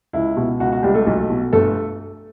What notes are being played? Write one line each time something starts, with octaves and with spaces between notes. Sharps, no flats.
C#2 E4
B2
C#2 F#4
F#4
C#2 G3 G4
A3 A4
B1 A3 A4
B2
G1 A3 A4